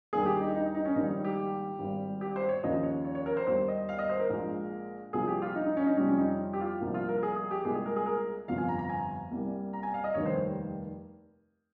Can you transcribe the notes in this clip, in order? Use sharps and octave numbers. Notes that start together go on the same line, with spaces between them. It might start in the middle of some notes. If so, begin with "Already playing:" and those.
D#2 D#3 G3 A#3 G#4
G4
D#4
D#4
D#4
C#4
A#1 G#2 D#3 G3 A#3 D#4
D#4
G4
G#1 G#2 G3
G4
C5
C#5
D#2 C#3 F3 D#5
C#5
C#5
C#5
A#4
C5
D#2 D#3 G3 A#3 C5
D#5
F5
D#5
C5
A#4
A#1 A#2 G#3
C2 A#2 F3 G#4
G4
F4
D#4
D#4
C#4
D#4
F2 C3 G3 C#4
C#4
D#4
G4
F4
C2 A#2 F3 A#3
F4
A#4
G#4
G#4
G4
C2 A#2 G#3 G#4
G#4
A#4
G#4
A#4
G1 F2 C3 F3 F5
G#5
A#5
A#5
G#5
C2 C3 G3 A#3
A#5
G#5
F5
D#5
F1 D#2 D#3 G3 C#5
C5